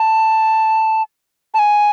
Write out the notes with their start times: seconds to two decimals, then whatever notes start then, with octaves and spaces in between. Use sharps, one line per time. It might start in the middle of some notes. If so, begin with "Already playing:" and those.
Already playing: A5
1.54 A5
1.59 G#5